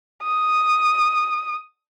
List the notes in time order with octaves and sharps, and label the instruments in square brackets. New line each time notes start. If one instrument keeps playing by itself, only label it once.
[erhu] D#6